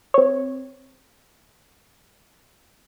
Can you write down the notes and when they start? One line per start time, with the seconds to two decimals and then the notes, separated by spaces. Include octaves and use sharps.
0.14 C4 C#5